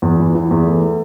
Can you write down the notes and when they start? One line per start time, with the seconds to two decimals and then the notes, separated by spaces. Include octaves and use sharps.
0.02 E2
0.19 E3
0.35 E3
0.51 E2
0.66 A3